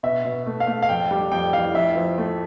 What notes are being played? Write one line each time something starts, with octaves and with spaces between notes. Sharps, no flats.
B2 E5
B2
A3
F5
A3
F5
F2 G5
G3
F2 G5
E3 F5
F2 E5
F3
A3